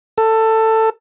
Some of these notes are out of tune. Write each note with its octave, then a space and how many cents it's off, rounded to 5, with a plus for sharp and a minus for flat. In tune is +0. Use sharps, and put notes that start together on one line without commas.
A4 +15